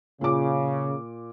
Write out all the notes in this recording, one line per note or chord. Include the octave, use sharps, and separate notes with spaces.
A#2 C#3 D6